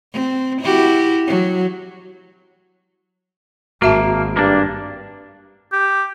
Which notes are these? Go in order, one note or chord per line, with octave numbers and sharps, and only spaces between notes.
C4
E4 F#4 G4
F#3
G#1 A#3 F#4 E5 A5
G2 A#3 D4
G4